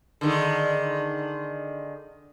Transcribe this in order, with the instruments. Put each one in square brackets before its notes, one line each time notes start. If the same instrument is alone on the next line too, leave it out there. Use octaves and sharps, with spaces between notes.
[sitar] D3 D#3 G#3